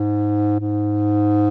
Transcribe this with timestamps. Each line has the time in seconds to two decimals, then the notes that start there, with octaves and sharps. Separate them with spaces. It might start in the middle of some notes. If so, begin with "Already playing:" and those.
Already playing: G#2
0.60 G#2